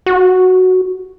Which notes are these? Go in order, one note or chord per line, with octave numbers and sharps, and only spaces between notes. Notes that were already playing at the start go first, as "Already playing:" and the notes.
F#4